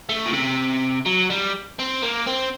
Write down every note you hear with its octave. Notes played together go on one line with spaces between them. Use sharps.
A3
A#2
C3
F#3
G3
C4
A#3
C4